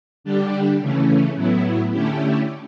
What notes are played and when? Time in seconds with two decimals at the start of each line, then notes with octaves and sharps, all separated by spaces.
0.24 D3 G3 D4 G4
0.80 C#3 E3 A3 C#4
1.35 A2 F#3 B3 E4
1.91 D3 A3 C#4 E4 G4